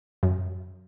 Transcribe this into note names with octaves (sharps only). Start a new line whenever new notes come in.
F#2